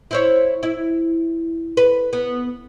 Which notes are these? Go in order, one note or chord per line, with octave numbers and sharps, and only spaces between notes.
E4 C5 C#5
E4
B4
B3